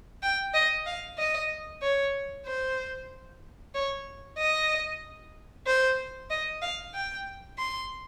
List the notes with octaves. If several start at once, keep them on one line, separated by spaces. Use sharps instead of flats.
G5
D#5
F5
D#5
C#5
C5
C#5
D#5
C5
D#5
F5
G5
C6